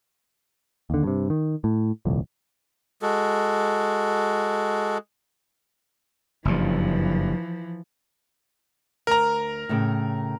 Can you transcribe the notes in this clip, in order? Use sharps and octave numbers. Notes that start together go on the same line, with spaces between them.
D#2 D3
G2 C3
D#3
A2
D#1 C2 F2
G#3 F#4 A4
F#1 G2 E3 F3
D2 A#4 A#5
A2 C#3 G5